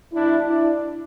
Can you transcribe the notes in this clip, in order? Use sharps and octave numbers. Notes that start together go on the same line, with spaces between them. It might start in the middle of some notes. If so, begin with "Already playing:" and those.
B2 G3 D4 E4
D4 E4